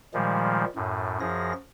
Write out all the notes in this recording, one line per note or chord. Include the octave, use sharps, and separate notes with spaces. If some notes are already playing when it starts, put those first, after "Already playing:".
A#2 D#3 F3 G3 G#3
F#2 A2
F#2 F3 G#4 A#6